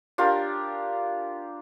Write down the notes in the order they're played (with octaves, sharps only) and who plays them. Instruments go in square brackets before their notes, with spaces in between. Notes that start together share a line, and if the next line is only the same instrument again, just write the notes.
[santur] D4 F4 G4 A#4